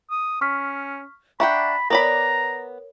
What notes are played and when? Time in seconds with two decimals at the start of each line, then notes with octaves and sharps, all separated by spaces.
0.11 D#6
0.41 C#4 C#6 F6 B6
1.40 D4 E5 F#5 G5 A#5 B5 C#6
1.90 B3 A#4 C#5 D5 A#5 B5